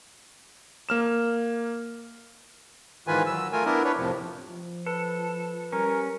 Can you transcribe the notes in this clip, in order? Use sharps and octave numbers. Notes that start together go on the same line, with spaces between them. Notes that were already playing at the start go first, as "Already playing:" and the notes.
A#3 F6 E7
G#2 D#3 E3 F4 B4 G#5
F#3 E6
A3 F4 A#4 G#5
B3 D4 E4 A#4
D4 B4 C#5
F2 A2 C3 F3
F3
A4 B4
G3 C#4 A#4